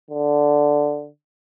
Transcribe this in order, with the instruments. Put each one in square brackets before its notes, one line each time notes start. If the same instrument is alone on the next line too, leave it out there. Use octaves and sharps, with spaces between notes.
[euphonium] D3